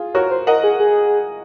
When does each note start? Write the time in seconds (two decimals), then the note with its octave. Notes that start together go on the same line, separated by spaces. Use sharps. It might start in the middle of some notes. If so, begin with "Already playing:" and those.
Already playing: F4 G#4
0.14 F#4 A#4 C#5
0.31 C5
0.47 A#4 D#5 F#5
0.63 G#4
0.79 G#4